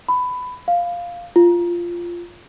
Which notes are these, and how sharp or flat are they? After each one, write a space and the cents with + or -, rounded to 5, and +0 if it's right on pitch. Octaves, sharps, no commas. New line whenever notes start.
B5 +15
F5 +0
F4 -10